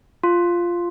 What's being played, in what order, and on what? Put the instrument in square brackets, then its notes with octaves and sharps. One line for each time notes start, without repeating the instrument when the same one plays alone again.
[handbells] F4